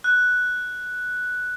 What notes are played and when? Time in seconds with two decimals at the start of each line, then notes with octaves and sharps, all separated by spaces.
0.04 F#6